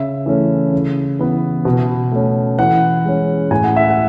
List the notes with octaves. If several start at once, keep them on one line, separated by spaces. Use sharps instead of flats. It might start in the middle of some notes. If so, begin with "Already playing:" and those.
Already playing: C#3 E5
E3 A3 C#4
C#3
E3 B3
B2
A3 C#4
E3 F#5
G#3 C#4
A2 G#5
F#5
E5
F#5